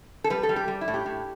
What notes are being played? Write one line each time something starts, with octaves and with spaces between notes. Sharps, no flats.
A4
G3 B4
A4
G3
G4
G3
E4
A2
G4
A2